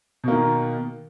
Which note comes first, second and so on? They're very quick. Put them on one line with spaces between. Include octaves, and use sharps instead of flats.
B2 A#3 D#3